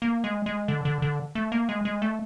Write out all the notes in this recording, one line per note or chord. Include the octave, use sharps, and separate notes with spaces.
A#3
G#3
G#3
D3
D3
D3
A3
A#3
G#3
G#3
A3